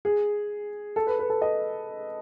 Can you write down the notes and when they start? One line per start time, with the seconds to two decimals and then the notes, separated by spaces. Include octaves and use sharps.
0.05 G#4
0.96 A4
1.07 B4
1.19 B4
1.30 A4
1.42 D#5